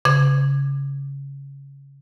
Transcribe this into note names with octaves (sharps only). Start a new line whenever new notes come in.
C#3 G#6